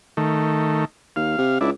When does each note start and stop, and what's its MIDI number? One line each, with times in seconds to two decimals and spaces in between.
0.17 0.85 51
0.17 0.85 57
1.16 1.38 39
1.16 1.58 77
1.38 1.59 48
1.61 1.71 37
1.61 1.70 62
1.61 1.70 64